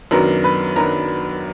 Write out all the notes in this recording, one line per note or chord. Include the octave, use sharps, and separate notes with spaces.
F#2 D#3 F#3 B3 D4 A#4 A#5
B4 B5
F#2 D#3 F#3 B3 D4 A#4 A#5